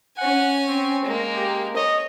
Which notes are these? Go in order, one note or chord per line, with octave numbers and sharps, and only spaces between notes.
C#4 F#5 G#5
C4
G#3 A#3
G4
C#5 D#5